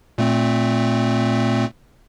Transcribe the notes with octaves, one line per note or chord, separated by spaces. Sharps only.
A#2 A3 C4